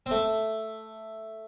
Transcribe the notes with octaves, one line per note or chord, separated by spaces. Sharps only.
C4
A3